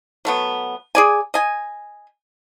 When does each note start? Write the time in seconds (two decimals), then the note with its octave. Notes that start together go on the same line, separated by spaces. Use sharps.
0.25 F#3 A3 B3
0.95 G#4 D5 G#5
1.34 D#5 G#5